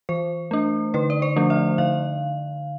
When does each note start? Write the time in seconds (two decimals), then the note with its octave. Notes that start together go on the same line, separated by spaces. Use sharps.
0.09 E3 C5
0.51 A3 D4
0.94 D3 B4
1.10 D5
1.22 C5
1.36 F3 A3 D4
1.50 E5
1.78 D3 F5